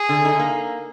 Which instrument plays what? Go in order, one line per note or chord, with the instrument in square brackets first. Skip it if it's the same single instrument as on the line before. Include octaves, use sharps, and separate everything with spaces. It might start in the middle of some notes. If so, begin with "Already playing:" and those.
Already playing: [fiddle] G#4
[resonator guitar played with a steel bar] D3
D#4
A#3